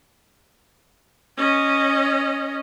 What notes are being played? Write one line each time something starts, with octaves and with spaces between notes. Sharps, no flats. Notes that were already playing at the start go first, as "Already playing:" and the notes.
C#4 D#5